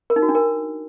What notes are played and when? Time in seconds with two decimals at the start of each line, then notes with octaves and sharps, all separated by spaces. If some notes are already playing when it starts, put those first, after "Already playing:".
0.10 A#4
0.16 D#4
0.22 F#4
0.29 D4
0.35 A#4